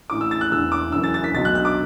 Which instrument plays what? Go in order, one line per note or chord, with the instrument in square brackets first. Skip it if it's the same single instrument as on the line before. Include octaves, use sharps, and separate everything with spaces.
[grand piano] A1 A2 E3 D6
E6
A6
F#6
E1 E2 E3 E6
D6
F#1 F#2 E3 E6
A6
A6
B6
B1 B2 F#3 A6
F#6
F#6
D6